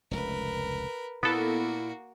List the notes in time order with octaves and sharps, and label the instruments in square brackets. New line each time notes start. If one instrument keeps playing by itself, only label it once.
[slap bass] F1 C#2 [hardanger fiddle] A#4 B4
[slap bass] A#2 [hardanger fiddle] A#3 F#4 [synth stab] B3 A4 [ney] E4